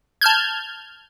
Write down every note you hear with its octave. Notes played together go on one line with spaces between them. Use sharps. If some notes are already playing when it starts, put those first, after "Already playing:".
A5 F6 G6 G#6